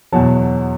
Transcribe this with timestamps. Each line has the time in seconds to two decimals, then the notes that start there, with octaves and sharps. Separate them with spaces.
0.12 E2 B2 F#3 A5